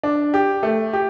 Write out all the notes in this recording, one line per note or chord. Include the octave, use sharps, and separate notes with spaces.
D4
G4
A3
G4